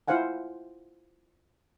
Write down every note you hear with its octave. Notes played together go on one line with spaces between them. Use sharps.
E4 F4 C5 F5 F#5 G#5